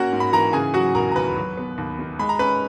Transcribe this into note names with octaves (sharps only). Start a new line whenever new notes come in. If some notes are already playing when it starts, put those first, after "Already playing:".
Already playing: A#3 C#4 F#4 A#4 F#5
G#2
B5
E3 A#4 A#5
C#3 G#4 G#5
F#3 F#4 F#5
E1 A#4 A#5
A#5
D#2 B4 B5
F#3
B3
D#2
D#3
G#3 B5
A#5
C#4 B4 B5